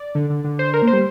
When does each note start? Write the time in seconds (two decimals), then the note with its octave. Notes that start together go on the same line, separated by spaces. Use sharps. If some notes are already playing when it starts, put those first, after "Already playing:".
Already playing: D5
0.15 D3
0.30 D3
0.44 D3
0.59 C5
0.74 A#4
0.82 A#3
0.87 C5
0.93 G3